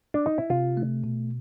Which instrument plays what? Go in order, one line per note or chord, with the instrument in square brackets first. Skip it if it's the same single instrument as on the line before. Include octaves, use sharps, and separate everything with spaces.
[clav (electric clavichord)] D4
D#4
E4
[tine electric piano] C3 [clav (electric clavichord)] F4
[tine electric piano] A3
B2